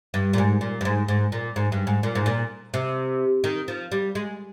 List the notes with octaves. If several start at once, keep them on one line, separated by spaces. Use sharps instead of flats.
G2
A#2
G#2
A#2
G2
G#2
G#2
A#2
G#2
G2
G#2
A#2
G#2
A#2
C3
D#3
F3
G3
G#3